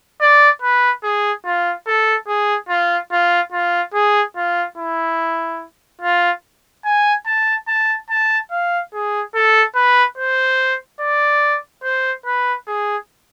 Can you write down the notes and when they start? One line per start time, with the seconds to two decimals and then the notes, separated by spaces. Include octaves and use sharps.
0.21 D5
0.62 B4
1.03 G#4
1.45 F4
1.87 A4
2.28 G#4
2.69 F4
3.12 F4
3.52 F4
3.94 G#4
4.36 F4
4.78 E4
6.02 F4
6.85 G#5
7.26 A5
7.68 A5
8.09 A5
8.51 F5
8.93 G#4
9.35 A4
9.75 B4
10.18 C5
11.00 D5
11.83 C5
12.26 B4
12.67 G#4